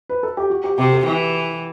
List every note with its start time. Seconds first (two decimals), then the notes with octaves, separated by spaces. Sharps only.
0.09 B4
0.23 A4
0.37 G4
0.50 F#4
0.64 G4
0.78 C3 G4
0.93 A4
1.06 E3